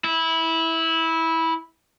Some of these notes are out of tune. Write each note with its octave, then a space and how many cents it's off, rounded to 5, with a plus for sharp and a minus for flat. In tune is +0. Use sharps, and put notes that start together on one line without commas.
E4 -15